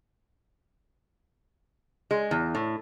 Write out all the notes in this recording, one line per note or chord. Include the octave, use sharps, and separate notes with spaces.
G#3
E2
A2